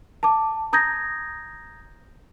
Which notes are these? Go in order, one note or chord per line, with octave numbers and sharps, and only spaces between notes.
A5 D6
A#5 D#6 G6 G#6 A#6